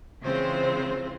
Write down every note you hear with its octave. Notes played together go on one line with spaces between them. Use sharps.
C#3 E3 G#3 C4 F4 C5